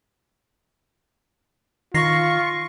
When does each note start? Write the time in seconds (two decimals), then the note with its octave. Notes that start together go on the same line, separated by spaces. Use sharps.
1.94 D#3 F4 C#6 A#6 C7